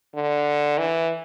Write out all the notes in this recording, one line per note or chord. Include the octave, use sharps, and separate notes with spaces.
D3
E3